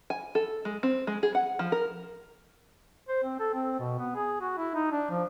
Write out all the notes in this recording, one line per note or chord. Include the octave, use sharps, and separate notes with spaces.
G#5
A4
G#3
C4
G#3
G#4
F#5
F3
A#4
C5
C4
A4
C4
B2
B3
G#4
F#4
E4
D#4
D4
F3